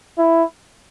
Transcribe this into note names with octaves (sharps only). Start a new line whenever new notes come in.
E4